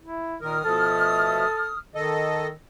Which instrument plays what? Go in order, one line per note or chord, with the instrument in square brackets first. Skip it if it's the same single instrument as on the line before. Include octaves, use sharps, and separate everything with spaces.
[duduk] E4
[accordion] A#2 A#4 [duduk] D#3 [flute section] D#6 F6
[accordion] B2 F3 A3 [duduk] A4
[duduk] D#3 [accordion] A4 D#5